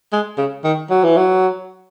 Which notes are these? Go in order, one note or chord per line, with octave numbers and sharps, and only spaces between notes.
G#3
C#3
D#3
F#3
E3
F#3